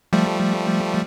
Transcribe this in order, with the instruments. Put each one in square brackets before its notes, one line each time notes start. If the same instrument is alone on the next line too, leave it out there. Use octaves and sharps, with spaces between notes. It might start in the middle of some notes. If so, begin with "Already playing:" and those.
[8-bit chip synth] F3 G3 A3